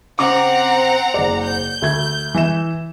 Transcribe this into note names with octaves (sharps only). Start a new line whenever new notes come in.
C#3 C4 F#5 A#5 D6
F#1 D5
G6
D2 E5 G#6
E3 E5 E7